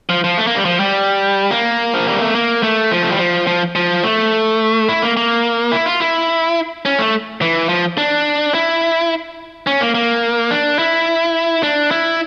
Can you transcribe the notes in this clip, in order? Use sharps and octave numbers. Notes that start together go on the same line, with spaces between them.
F3
F3
A3
A#3
G3
F3
G3
A#3
F3
G3
A3
A#3
A3
F3
A3
G3
F3
F3
F3
A3
E4
A#3
A#3
E4
F4
E4
C#4
A3
E3
F3
D4
E4
C#4
A#3
A#3
D4
E4
D4
E4